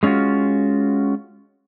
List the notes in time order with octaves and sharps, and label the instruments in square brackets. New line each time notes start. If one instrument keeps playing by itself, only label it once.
[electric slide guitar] G#3 C#4 D#4 F4 F#4